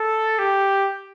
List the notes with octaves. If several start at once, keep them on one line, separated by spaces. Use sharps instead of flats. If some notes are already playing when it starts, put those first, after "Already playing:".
Already playing: A4
G4